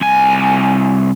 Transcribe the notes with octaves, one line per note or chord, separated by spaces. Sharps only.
C2 G#5